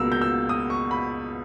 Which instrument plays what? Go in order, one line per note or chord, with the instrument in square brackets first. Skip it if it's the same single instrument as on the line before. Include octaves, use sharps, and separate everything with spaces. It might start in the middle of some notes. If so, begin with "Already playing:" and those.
Already playing: [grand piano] C#2 B2 A#3 E6
G6
E6
D#6
C#6
B5